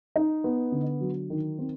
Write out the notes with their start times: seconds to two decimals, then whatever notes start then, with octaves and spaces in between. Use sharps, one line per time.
0.16 D#4
0.44 B3
0.72 D3
1.00 F#3
1.30 D#3
1.59 C4